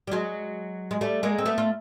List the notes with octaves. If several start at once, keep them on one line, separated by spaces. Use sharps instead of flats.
G3
F#3 G#3
G#3
G3 A3
G#3 A#3
C4
A3 B3
F4